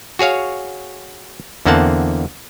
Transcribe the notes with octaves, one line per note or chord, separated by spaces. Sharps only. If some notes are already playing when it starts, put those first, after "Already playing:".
F#4 G#4 C#5 F5
E2 D3 A#3 C4 F#5 A5